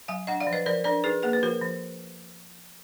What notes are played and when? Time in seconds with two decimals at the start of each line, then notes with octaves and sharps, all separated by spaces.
0.08 F#3 F5 G#5
0.27 D4 D#5 F#5
0.40 D5 F5
0.47 F3
0.53 B4 D#5
0.66 F3 A#4 D5
0.84 D4 A#4 D5
1.04 D#4 G#4 B4
1.23 A#3 G#4 B4
1.33 B4
1.42 F3 F#4 A#4
1.61 F3